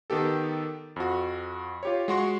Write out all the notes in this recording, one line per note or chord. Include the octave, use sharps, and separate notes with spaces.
D#3 B3 G4 A4
F2 F#4
F4 G4 C#5
G#3 F#4 C6 C#6